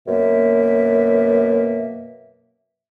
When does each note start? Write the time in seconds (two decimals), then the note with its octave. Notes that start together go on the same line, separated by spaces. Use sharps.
0.08 F#2 B2 A#3 E5